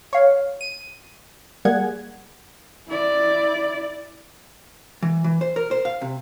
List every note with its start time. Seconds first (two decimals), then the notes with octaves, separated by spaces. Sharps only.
0.13 C#5 F5
0.61 D#7
1.65 G3 A#3 G#4 F#5 G#6
2.88 E4 D5
5.02 E3
5.24 E3
5.41 C5
5.56 A#4
5.71 C5
5.85 F5
6.02 C3